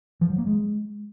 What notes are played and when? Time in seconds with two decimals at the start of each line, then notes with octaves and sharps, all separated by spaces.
0.21 F3
0.30 F#3
0.38 A#3
0.47 G#3